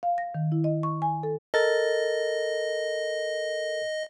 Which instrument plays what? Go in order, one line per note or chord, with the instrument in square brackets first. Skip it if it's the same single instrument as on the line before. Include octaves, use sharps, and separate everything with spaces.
[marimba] F5
A#6
D#3
E4
D#5
C#6
G#5
A4
[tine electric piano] A4 A#4 A6 [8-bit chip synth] D#5